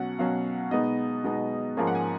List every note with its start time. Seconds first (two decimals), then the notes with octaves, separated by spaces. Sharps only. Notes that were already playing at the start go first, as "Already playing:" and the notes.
Already playing: B2 F#3 C#4 F#5
0.19 B2 F#3 C#4 F5
0.71 B2 G#3 B3 D#4 D#5
1.24 B2 G#3 B3 D#4
1.77 G#2 F3 A#3 C#4 G#5
1.87 F#5
1.95 G#5